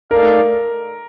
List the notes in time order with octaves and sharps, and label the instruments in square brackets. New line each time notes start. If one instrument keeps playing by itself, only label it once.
[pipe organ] A3 D#4 A4 D5 F5 [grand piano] A#4